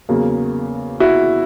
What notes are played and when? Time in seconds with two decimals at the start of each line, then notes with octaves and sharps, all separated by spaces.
0.09 E2 C#3 F#3 A#3
1.00 E4 F#4